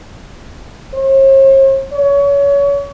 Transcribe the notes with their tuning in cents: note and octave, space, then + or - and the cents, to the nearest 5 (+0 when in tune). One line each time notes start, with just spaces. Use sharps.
C#5 -45
C#5 +30